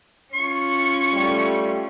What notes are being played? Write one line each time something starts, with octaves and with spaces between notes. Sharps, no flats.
C#4 F4 C#6
G3 A3